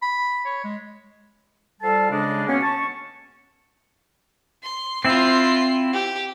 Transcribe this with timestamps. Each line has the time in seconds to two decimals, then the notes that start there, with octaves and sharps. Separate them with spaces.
0.02 B5
0.45 C#5
0.64 G#3
1.81 F3 G3 A4 F5 A5
2.11 C#3 G#3 D4
2.47 B2 A#3 B3 C#4
2.62 A5 C#6
4.63 C6
5.05 C4 E4 F4 C7
5.93 G4